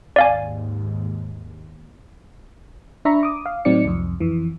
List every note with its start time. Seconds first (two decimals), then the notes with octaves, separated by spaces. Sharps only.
0.16 D#2 G#2 D5 F5 G#5
3.05 D4 E5 A#5 B5 C#6
3.23 D6 D#6
3.46 F5
3.65 A2 F#3 C4 D#4 D5 C#7
3.85 C2 F2
4.20 F2 E3